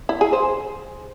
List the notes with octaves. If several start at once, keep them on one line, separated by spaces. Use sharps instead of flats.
E4
G#4
C5